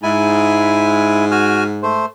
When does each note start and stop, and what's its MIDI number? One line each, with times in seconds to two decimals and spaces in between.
0.03 2.07 44
0.03 1.25 64
0.03 1.25 80
1.31 1.64 66
1.31 1.64 80
1.31 1.64 89
1.83 2.06 57
1.83 2.06 72